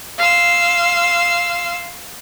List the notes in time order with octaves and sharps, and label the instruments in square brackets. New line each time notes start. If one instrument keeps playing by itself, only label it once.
[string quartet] F5 C6 E6